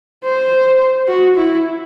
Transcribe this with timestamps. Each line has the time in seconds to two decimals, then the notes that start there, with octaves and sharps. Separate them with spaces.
0.24 C5
1.08 F#4
1.36 E4